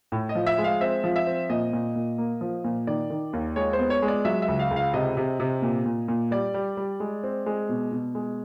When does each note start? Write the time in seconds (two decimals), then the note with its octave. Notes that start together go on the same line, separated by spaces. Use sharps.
0.12 A2
0.29 D#5
0.35 F3
0.47 E5
0.58 G#3
0.64 F5
0.81 C4 E5
1.04 F3
1.16 E5
1.27 C4
1.49 A#2 D#5
1.73 A#2
1.95 A#2
2.18 A#3
2.41 F3
2.64 A#2
2.87 D#3 D5
3.10 D#3
3.33 D#2
3.56 G#3 C#5
3.73 C5
3.79 B3
3.90 C#5
4.02 G#3
4.08 D5
4.25 F#3 E5
4.42 E5
4.48 C#2
4.59 F5
4.71 C#2
4.76 F5
4.94 C3 D#5
5.17 C3
5.40 C3
5.62 A#2
5.86 A#2
6.08 A#2
6.31 G3 D5
6.54 G3
6.77 G3
7.00 G#3
7.23 C4
7.46 G#3
7.69 B2
7.92 B2
8.15 G#3